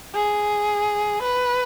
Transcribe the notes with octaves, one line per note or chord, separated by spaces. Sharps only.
G#4
B4